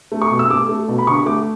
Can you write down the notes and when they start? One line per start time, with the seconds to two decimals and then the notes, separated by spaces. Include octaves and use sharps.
0.12 A3
0.22 C#6
0.31 B2
0.39 E6
0.50 A3 D6
0.69 A3
0.88 B2
0.98 B5
1.07 D3 C#6
1.26 A3 D6